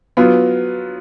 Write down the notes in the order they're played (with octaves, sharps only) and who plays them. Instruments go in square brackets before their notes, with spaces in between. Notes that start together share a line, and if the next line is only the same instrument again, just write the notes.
[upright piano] F#3 B3 F4